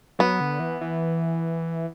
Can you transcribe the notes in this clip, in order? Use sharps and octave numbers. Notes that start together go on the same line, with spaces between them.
F#3 B3
D3
E3
E3